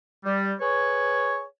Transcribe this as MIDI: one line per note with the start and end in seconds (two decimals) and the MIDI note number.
0.24 0.53 55
0.59 1.42 68
0.59 1.42 71
0.59 1.42 73